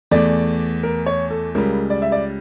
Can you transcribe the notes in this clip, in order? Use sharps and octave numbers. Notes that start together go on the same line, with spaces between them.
E2 E3 A3 D5
A#4
C#5
A4
C#2 C#3 G3 A#4
D5
E5
D5